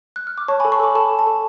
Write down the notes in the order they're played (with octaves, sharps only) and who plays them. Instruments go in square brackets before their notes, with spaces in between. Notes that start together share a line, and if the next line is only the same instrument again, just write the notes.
[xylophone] F#6
F6
D6
C#5 A5 C#6
G#5 B5
A4
A5 C#6
A4 B5 D6
A4 A5 C#6
A4
A5
A4